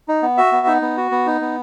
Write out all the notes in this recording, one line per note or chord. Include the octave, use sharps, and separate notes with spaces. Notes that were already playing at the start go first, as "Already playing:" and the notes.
D#4
B3
F#4 E5
B3
D#4
B3
F#4
B3
D#4
B3